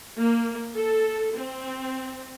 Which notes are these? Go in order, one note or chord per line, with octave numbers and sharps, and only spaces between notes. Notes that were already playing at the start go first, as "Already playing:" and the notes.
A#3
A4
C4